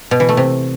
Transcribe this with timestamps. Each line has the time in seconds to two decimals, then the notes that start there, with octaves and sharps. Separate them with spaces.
0.11 B2
0.20 E3
0.29 A3
0.37 C3